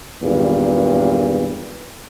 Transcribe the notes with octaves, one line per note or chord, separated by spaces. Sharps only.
G#1 E2 G2 A#2